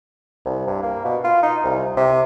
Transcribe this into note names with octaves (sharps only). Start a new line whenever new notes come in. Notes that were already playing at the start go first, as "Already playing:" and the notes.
C2
G2
A#3
B2
F4
D#4
C2
C3